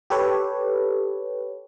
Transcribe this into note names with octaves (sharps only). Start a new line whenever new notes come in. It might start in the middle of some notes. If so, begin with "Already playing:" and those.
G4 A4 B4 C#5